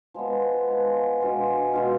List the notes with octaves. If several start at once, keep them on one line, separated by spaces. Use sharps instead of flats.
F3 G#3 B3
F3 G#3 B3
B2 G#3 D4 F4
B2 G#3 D4 F4